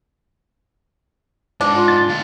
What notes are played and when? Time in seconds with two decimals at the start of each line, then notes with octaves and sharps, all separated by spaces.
1.61 G#2 D4 D#4
1.75 F4
1.88 A6
2.08 D2 F5